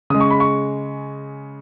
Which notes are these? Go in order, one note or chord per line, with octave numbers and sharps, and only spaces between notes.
C#3 G#3 D#6
C#6
B5
C#6